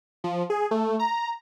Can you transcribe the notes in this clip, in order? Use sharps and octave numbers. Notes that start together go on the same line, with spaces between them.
F3
G#4
A3
A#5